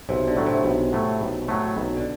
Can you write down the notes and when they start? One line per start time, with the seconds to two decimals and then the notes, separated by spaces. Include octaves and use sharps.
0.09 B1 C3
0.27 D3
0.36 A2 F#3 A3
0.46 C3
0.64 B1
0.93 A2 F#3 A3
1.21 B1
1.48 A2 F#3 A3
1.77 B1
1.96 D3